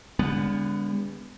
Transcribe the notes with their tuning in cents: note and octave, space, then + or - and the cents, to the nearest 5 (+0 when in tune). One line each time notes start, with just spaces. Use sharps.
D3 -35 G#3 -45 B3 +0